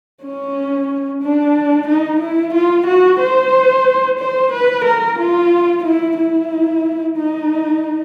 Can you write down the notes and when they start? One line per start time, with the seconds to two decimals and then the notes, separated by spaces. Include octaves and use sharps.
0.23 C#4
1.23 D4
1.88 D#4
2.21 E4
2.54 F4
2.87 F#4
3.20 C5
4.20 C5
4.53 B4
4.85 A#4
5.19 F4
5.84 E4
6.17 E4
7.17 D#4